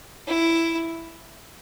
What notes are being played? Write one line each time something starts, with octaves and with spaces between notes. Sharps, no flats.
E4